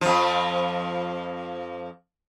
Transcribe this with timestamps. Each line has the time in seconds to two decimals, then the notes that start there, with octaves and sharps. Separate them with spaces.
0.01 F2 F3